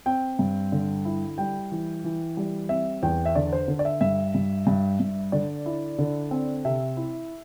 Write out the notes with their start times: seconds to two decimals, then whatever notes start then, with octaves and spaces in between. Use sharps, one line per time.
0.06 C4 G5
0.39 G2
0.72 D3
1.05 E4
1.38 G3 G5
1.72 E3
2.04 E3
2.37 G3
2.69 C4 E5
3.03 E2 G5
3.26 E5
3.35 D3 D5
3.53 C5
3.68 D3
3.79 D5
3.85 E5
4.01 G2 E5
4.35 G2
4.67 G2
5.00 G2
5.32 D3 D5
5.66 E4
5.98 D3
6.31 C4
6.65 C3 E5
6.97 E4